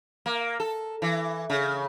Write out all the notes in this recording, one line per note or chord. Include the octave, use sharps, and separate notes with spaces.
A#3
A4
E3
C#3